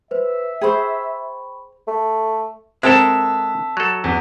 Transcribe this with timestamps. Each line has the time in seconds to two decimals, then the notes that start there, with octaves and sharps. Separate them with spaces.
0.11 B4 C5 E5
0.61 G#4 C5 G5 B5 C#6
1.88 A3
2.83 G#3 C4 A4 A#4 E5 A5
3.77 F#3 A4
4.04 E2